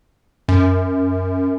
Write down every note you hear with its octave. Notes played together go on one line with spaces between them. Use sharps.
F#2